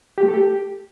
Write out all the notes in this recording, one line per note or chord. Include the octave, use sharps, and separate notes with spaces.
G4
A3
A4
G4